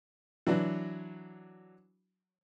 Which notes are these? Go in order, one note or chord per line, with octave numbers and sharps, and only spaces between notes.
E3 F#3 D4 F#4